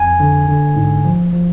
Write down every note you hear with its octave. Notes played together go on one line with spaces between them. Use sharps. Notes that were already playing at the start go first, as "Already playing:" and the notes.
Already playing: F2 G#5
D3
D3
G#2
F3
F3